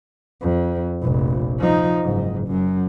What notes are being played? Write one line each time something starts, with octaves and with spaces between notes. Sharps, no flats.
F2
F1 A#1
F3 D#4
F#1 G#2
F#2